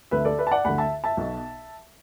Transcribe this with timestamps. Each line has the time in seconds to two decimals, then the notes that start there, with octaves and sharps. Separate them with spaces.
0.11 D2 D3 B4 E5
0.25 A4 D5
0.38 B4 E5
0.47 A5
0.51 D5 F#5
0.65 D2 D3 F#5 B5
0.78 E5 A5
1.04 E5 A5
1.17 B1 B2